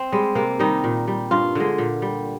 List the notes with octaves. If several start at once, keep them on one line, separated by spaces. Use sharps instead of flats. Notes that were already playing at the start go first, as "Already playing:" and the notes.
Already playing: C4
G3 G#3
C3 A#3
D#3 G3 D#4
A#2
G3
G2 F4
D3 G#3
A#2
G3